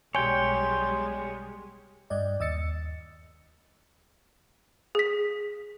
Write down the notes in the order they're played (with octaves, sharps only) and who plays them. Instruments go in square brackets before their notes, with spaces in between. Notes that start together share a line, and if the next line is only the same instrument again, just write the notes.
[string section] B1 G3 G#3 [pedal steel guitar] C#5 G5 [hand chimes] G#5 [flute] C6
[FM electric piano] G2 D5 D#5
D#2 D#5 E6 A6 C#7
[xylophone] G#4 B6